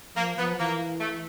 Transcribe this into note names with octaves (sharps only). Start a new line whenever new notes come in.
F3 A#3
F3 B3
E3 A#3
A3